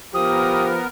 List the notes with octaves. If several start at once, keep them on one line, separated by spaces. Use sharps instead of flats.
F3 B3 G4 A#4 D#6